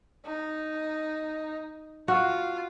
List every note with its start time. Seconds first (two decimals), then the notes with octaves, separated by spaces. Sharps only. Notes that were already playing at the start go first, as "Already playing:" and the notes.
0.26 D#4
2.08 F4 F#4